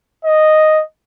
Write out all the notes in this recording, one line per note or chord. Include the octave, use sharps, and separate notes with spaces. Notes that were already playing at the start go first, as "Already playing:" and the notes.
D#5